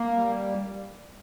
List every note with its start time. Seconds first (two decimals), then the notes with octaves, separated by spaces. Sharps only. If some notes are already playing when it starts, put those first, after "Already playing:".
Already playing: A#3
0.16 G3